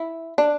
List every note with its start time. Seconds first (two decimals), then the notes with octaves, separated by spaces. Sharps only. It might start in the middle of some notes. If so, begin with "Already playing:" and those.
Already playing: E4
0.38 D4